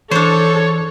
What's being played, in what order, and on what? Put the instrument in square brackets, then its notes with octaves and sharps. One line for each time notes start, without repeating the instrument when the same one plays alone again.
[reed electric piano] E3 [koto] D4 C5 [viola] A4 [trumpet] C#5